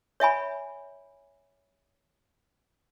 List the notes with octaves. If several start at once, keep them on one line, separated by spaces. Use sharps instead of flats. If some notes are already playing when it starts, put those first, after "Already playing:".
C#5 E5 G#5 B5